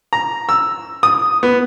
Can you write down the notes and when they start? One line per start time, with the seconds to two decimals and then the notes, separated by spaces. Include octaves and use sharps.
0.13 A#5
0.49 E6
1.03 D#6
1.43 B3